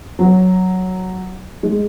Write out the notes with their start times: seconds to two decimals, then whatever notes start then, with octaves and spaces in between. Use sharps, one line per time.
0.19 F#3
1.63 G#3